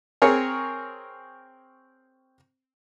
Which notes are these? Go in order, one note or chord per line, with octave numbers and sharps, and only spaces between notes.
C4 G#4 A#4 C#5